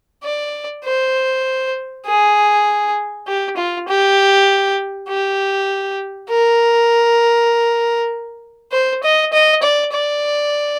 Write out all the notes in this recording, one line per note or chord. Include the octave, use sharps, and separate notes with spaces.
D5
C5
G#4
G4
F4
G4
G4
A#4
C5
D#5
D#5
D5
D5